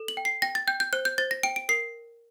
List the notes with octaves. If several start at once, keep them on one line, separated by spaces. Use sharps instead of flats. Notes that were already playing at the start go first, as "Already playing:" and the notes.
Already playing: A4
F#7
G5
C7
G5 A#6
A6
G5 G6
G6
C5 F#6
G6
C5 A6
A#6
G5 D7
D7
A#4 C7